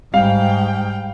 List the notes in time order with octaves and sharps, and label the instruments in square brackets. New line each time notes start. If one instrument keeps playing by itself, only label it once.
[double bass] G#2 [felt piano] G3 [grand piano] F5 [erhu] G5